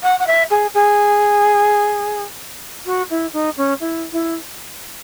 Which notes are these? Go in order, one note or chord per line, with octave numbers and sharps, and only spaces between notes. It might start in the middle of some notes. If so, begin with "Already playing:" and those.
F#5
F#5
E5
G#4
G#4
F#4
E4
D#4
C#4
E4
E4